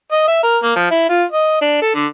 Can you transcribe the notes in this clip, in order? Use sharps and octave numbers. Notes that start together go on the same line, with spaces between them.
D#5
E5
A#4
A#3
F3
E4
F4
D#5
D4
A4
D3